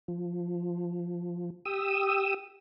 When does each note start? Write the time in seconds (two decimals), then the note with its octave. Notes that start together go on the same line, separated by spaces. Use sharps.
0.08 F3
1.65 G4 D#6 E6